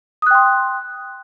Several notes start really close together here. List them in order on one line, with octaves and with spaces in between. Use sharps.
D#6 F#6 G5 C6